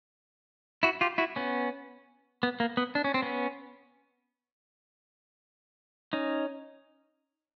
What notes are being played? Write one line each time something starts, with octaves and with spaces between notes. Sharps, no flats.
E4 F#4
F4 G4
E4 F#4
B3 C#4
B3
A#3
B3
D4
C#4
C4
B3 C#4
C#4 D#4